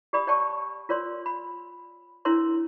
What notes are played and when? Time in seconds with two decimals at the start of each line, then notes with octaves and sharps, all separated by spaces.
0.13 G4 D5 B5 D#6
0.27 G4 C#5 D5 G5 A5 C#6
0.89 F4 A#4 C#5 D5 C6
1.26 B5
2.25 D4 E4 A#4 C#5 C6